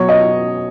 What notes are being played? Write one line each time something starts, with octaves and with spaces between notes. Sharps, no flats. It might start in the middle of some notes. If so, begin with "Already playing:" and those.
Already playing: B2 F#3 C#5
D#5